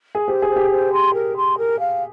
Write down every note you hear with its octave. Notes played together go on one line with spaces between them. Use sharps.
G#4
G4 C5
G#4
C5
G4
C5
C6
A#4
C6
A#4
F5